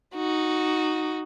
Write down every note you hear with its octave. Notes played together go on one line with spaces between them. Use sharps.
D#4 F#4